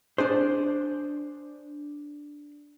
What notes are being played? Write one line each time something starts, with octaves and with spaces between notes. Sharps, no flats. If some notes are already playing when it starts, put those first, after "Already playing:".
D4 G#4 C5